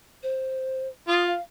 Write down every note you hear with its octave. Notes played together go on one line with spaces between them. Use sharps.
C5
F4 D#6
F5